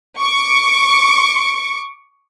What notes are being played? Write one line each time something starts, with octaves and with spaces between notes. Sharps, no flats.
C#6 D6